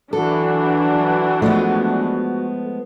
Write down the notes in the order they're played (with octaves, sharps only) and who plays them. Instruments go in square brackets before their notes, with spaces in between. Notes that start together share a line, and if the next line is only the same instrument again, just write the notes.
[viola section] E3 F#3 D4 [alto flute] F#4 [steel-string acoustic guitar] A4
[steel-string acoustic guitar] F3 G#3 B3 [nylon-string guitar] A3